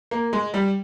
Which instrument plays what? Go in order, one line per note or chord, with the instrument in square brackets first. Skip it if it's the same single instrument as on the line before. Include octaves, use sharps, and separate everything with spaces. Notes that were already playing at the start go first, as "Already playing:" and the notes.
[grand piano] A#3
G#3
G3